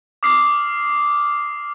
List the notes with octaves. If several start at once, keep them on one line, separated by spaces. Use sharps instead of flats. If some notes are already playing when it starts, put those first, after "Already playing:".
D6 D#6 F6 C7